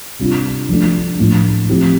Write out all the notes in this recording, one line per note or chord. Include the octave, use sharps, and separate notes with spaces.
C3 G3 D4 F4
F3 A3 D4
A2 F3 A3
F3 C4 E4 G4